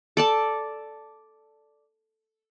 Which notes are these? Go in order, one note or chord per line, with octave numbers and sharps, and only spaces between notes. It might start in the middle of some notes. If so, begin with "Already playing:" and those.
A4 D5 A5